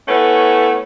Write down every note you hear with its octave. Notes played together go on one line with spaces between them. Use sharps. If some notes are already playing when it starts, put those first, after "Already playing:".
A3 B3 C#4 E4 B4